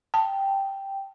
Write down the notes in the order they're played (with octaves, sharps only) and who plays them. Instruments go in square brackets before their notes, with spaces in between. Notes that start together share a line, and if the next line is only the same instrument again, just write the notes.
[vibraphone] G5 [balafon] A5